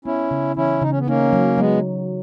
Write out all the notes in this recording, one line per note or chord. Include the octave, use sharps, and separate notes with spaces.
B3 C#4 E4
C#3
E3 C#4 E4
C#3 D#4
C#4
B3
A#3 C#4 D#4
F#3
F#3 G#3 B3